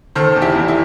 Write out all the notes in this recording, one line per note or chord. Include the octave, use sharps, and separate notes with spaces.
D#3 A4 C5
E2
E4 G4
E2
E4